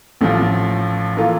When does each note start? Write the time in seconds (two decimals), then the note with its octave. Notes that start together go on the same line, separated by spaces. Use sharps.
0.21 A1 A2 F3
1.17 E3 A#3 F4 A4